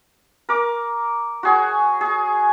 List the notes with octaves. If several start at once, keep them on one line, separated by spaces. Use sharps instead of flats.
A#4 D6
F#4 G#4 C#5
G#4